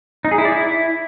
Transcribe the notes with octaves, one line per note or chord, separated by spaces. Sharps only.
D#4
G#4
E4
D5
E4